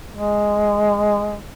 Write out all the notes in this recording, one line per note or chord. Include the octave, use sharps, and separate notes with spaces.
G#3